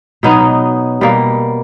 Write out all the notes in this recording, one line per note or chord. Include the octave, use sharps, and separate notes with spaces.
B2 F#3 B3 D#4
B2 G3 A#3